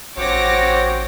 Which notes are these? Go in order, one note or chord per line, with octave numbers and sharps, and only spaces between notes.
A1 C4 F#4 C#5 D6 A#6